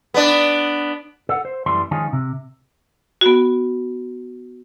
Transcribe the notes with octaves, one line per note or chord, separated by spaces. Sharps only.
B3 D4
A4 F#5
C5
F#2 E3 G3 A3 C6
D#3 F3 G#3 C#4 D#4 F4
C3
B3 F#4